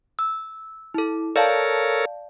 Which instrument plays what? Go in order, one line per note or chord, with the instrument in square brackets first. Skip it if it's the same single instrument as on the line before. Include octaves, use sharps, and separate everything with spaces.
[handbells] E6
E4 A4
[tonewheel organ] A4 A#4 C#5 [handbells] D5 F5 A5